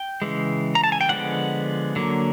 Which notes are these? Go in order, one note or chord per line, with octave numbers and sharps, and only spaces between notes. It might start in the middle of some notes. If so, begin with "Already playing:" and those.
Already playing: G5
C#3 E3 G#3
A#5
A5
G#5
G5
D3 F3 G#3 B3 F#5
D3 F#3 A#3